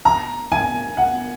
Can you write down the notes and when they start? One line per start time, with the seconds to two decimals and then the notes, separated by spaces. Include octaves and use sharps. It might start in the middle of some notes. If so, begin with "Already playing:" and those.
0.05 A#5
0.52 G#5
0.97 F#5